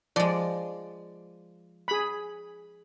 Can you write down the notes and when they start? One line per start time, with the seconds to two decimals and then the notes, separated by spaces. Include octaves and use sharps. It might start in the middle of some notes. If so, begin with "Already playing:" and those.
0.16 F3 G#3 D5
1.88 G#4 B5